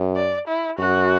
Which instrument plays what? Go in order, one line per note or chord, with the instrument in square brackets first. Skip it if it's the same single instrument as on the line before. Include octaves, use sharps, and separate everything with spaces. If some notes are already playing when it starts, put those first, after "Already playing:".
Already playing: [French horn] F#2
[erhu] D5
E4
[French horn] F#2 [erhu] F#4